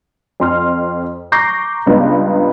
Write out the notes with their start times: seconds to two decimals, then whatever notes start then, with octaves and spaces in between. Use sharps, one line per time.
0.40 F2 C6 F6
1.32 A#5 C#6 D6 G6 A#6 C7
1.86 C#2 G2 G#3 B3 D5 A#5